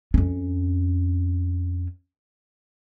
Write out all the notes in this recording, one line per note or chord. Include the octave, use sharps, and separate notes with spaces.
F2 C#4